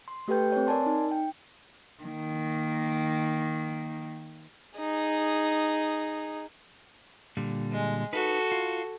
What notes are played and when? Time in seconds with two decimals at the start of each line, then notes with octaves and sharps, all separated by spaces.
0.08 C6
0.28 A3 G4 A4 B4 G5 G6
0.52 C4 C#5
0.67 A#4 D5 G#5 A5 C6
0.86 D#4
1.12 G5
2.03 D#3 A#3
4.78 D#4 G#4
7.37 A#2 D3 G3
7.71 G#3
8.13 D#4 F#4 A4 B4
8.52 F4